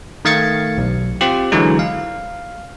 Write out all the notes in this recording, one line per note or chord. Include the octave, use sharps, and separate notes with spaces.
D#3 A3 F5 G#6 A6 C#7
B1
C4 F4 G4
D3 E3 F#3 G#3 D#4
F5